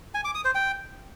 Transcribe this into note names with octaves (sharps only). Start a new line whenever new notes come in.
G#5
D6
D#6
C5
G5